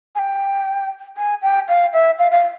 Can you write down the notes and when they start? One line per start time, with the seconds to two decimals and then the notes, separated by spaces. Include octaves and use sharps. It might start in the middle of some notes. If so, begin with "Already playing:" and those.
0.15 G#5
0.19 G5
1.17 G#5
1.42 G5
1.69 F5
1.93 E5
2.19 F5
2.31 F5